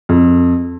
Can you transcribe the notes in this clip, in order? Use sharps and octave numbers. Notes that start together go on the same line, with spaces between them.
F2